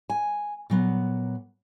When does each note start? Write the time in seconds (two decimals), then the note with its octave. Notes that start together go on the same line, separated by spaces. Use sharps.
0.10 G#5
0.70 A#2 F#3 B3